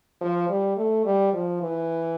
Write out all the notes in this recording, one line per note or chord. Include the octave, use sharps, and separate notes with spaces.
F3
G3
A3
G3
F3
E3